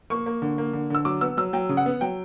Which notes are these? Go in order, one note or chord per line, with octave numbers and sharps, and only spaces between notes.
A#3 C#6
A#3
D3
A#3
D3
D3 E6
F#3 D6
B3 E6
F#3 E6
F#3 G5
C#3
F#5
B3
F#3 G5